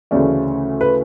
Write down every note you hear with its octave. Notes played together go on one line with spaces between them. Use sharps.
D2 C#3 E3 A3 C#4 D5
B4